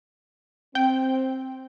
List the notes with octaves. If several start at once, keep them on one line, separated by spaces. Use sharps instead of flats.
C4 G5